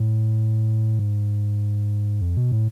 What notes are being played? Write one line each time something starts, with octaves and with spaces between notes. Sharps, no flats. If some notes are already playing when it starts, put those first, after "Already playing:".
Already playing: A2
G#2
F2
B2
A2